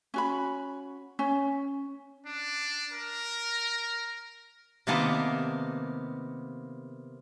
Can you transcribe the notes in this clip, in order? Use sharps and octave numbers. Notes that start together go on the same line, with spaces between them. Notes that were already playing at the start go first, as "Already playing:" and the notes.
C#4 F#4 B5
C#4
D4
A#4
C3 D#3 A#3 B3 A5